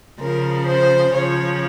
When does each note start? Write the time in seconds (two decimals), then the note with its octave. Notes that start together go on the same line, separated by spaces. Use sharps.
0.19 C#3 F3 A#4
0.66 C5
1.14 C#3 F3 C#5